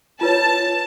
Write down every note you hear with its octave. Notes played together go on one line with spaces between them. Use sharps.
F4 B4 C#5 A5